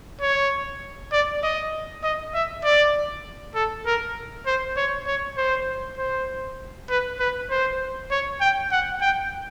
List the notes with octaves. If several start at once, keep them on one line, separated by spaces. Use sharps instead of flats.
C#5
D5
D#5
D#5
E5
D5
A4
A#4
C5
C#5
C#5
C5
C5
B4
B4
C5
C#5
G5
F#5
G5